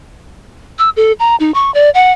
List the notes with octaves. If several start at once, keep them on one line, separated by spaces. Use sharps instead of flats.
E6
A4
A#5
D#4
C#6
D5
F#5